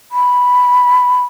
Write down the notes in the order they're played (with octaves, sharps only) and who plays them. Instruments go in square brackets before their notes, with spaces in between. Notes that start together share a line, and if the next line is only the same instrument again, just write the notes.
[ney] B5